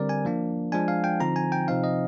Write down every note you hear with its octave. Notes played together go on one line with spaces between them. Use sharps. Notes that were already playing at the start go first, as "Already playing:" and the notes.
Already playing: D3 G3 C4 A#4 D5
G#5
F3 A#3 D4
F3 G#3 D4 G#5
F5
G5
D3 F3 C4 D#4 A#5
G#5
G5
C3 F3 C4 D#4 F5
D#5